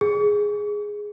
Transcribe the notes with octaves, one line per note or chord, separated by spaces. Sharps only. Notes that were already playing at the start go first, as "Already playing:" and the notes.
G#4